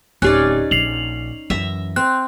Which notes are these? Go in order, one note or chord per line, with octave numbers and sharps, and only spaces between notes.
D1 C#4 D#4 G4 D5 F#6
A#1 C7 F7 F#7
F#2 E3 E5 A#5
C4 F#6